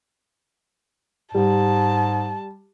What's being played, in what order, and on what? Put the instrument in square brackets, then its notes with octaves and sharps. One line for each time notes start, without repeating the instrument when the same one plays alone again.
[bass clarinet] G#2 [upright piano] G3 [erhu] A5